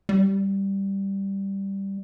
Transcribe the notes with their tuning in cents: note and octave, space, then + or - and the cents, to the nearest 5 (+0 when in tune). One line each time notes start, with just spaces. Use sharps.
G3 +0